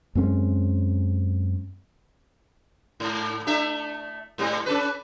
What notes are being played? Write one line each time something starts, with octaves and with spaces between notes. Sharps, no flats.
F#2 G#3 C4 C#4
G#2
A3 D4 E5
G#2 G3 C4
C#4 A4 B4